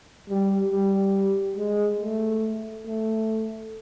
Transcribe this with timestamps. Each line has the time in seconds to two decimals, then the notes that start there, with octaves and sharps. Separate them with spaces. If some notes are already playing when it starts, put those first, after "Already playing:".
0.30 G3
0.71 G3
1.57 G#3
2.01 A3
2.86 A3